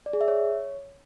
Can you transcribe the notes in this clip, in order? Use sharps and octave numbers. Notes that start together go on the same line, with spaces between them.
D5
G#4
E5
C#5